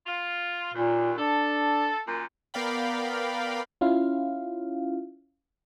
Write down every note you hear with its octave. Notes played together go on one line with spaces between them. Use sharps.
F4
D#2 A#2
D4 A4
F#2 A#2
B3 A#4 D5 F5 G5 B5
C#4 E4 F4 F5